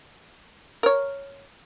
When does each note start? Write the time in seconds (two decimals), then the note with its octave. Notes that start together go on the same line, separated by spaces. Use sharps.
0.83 A#4 C#5